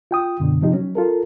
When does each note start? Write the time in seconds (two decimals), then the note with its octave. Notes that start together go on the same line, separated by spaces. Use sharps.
0.11 F4 G5 D#6
0.40 F#2 B2 D3
0.61 C3 F3 D#4 G4
0.73 F#3 C#4
0.95 F4 A4 A#4